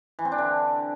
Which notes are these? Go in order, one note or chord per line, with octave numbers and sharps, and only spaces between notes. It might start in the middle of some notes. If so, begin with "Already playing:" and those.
E3
C4
D4
D3